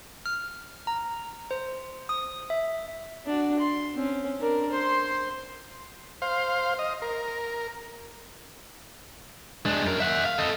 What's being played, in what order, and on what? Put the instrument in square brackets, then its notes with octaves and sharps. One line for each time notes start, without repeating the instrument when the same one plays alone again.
[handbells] F6
A#5
C5
D#6
E5
[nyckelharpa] D4 F#4
C6
C4 C#4
D4 A#4
C5 C6
[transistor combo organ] C5 F5
D#5
A#4
[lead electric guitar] G#3 D4
F#2 A#4
E5 F#5
F5
A4 D#5